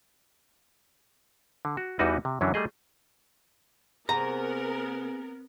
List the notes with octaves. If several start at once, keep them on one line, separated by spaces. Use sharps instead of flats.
D3
F#4
E2 E3 G3 D#4 F#4 B4
C3
F#2 D3 E3 F#3 C#4 D4
G3 A3 G#4 D#5
C3 B3 G#4 A#4 F#5 A#5